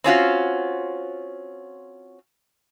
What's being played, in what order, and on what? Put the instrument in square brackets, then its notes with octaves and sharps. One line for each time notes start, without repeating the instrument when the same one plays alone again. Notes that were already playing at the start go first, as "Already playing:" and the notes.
[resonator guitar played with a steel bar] C4 C#4 F4 F#4